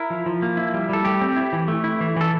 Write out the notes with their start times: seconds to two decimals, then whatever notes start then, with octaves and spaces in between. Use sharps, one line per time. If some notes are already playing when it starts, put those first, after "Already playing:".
Already playing: E4 A#4
0.10 F3
0.26 F3
0.42 A#3
0.57 E4
0.74 G3
0.89 G3 A4
1.05 A3 G4
1.21 C4
1.37 E4
1.53 E3
1.68 A3
1.84 E4
2.01 E3
2.16 E3 A4